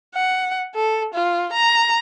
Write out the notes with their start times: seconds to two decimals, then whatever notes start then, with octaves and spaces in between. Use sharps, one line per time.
0.15 F#5
0.75 A4
1.14 F4
1.53 A#5